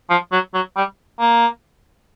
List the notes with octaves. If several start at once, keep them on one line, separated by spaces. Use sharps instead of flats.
F3
F#3
F#3
G3
A#3